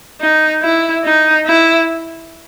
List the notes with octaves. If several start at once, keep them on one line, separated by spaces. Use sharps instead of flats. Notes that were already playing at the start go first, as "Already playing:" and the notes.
D#4
E4
D#4
E4